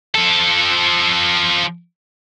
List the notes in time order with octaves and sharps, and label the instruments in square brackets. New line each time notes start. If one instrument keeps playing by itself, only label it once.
[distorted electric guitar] F3 A4